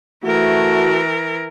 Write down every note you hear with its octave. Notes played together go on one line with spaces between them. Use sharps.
E3 A3 F#4 A#4